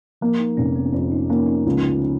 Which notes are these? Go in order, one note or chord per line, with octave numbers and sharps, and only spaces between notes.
F3 A#3
D#4
F1 C#4
B3
F2 C#4
D#4
A#3 C#4
D#4
C#2